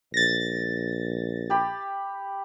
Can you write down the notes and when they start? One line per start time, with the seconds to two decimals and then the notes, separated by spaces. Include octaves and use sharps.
0.14 A#1 A6 A#6
1.50 G4 B5